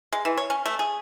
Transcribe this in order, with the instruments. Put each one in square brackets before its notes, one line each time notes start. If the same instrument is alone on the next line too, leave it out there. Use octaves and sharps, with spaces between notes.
[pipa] G#3
E3
C#5
C#4
A3
G#4